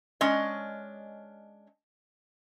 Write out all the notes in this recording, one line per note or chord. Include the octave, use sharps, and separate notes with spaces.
G#3 C#4 D4 D#5